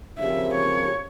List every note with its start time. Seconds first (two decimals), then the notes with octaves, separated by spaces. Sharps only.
0.18 C#3 F3 C4 G4 A#4 E5
0.55 C#5